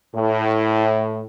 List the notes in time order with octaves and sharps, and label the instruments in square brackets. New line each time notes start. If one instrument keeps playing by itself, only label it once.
[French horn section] A2